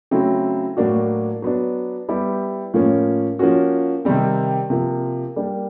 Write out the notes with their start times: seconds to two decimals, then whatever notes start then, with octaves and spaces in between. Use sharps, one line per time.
0.11 C#3 F#3 A3 C4 E4
0.77 A2 F#3 A#3 D4 F#4
1.42 F#3 B3 D4
2.09 G3 B3 E4 G4
2.74 A2 F3 A#3 C#4
3.39 F3 A#3 C#4 F#4
4.05 C3 D#3 G3 C4
4.70 C3 F3 A#3
5.36 G3 A#3 D4